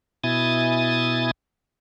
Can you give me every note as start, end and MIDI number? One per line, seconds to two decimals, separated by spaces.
0.24 1.31 47
0.24 1.31 64
0.24 1.31 80
0.24 1.31 87
0.24 1.31 93